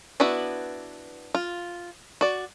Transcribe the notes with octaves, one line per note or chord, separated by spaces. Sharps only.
B3 D4 E4 F#4 B4
F4
F#4 D5